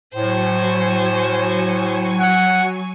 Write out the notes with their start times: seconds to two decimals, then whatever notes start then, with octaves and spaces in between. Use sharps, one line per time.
0.15 A2 F#3 C5 G#5 C#6
2.20 F#5